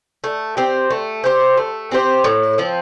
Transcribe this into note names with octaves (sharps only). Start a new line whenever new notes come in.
A3
C4 G4 C5
A3
C4 G4 C5
A3
C4 G4 C5
A2
F3 C4